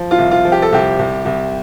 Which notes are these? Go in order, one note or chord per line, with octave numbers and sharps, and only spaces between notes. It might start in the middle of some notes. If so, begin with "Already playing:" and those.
Already playing: F3
F4
C2
F4
F3
G4
A4
C2 G4
C2
C2